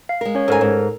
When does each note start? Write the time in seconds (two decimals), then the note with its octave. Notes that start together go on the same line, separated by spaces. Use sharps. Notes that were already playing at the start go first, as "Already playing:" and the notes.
0.09 F5
0.21 G#3 A#4
0.35 C#4 C#5
0.48 G#2 A4 A#4 G#5 A#5
0.61 G#2